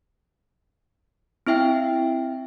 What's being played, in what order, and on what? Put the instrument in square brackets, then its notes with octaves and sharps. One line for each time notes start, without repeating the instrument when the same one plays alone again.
[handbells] C4 E4 E5 G5